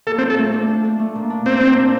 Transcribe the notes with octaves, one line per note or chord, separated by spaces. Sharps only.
A#2 A4
C4
F4
A4
A3
D4
D4
D4
A3
A#2
D4
A#2 C4
A#2
D4